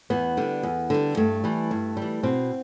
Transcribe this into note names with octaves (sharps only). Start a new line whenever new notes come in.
E2 B3
D3 G3
E2
D3 G3
G2 A3
E3 G3
G2
G3
E3
B2 C4